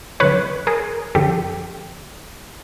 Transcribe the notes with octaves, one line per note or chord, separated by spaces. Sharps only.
F#2 D3 F3 B4 C#5
G#4 A#4
F#2 D3 F3 G4 A4